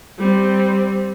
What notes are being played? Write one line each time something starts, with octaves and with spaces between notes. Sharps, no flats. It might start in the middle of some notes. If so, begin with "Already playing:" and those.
G3 C4